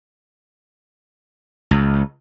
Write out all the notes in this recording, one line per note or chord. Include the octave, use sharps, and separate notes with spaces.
C#2